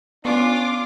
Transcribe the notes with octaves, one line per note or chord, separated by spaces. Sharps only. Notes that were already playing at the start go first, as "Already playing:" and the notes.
B3 C#4 D4 F4 D6